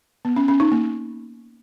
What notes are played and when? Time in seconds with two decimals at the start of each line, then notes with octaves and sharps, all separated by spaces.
0.25 B3
0.36 C#4
0.48 C#4
0.60 D#4
0.72 A#3